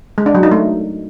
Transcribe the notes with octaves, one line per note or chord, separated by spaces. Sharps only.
G#3
D4
F#3
D#4
A3